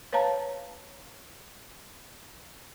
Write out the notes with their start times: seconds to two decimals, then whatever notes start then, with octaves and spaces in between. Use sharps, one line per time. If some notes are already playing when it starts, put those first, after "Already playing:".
0.13 B4 C#5 F5 A5 A#5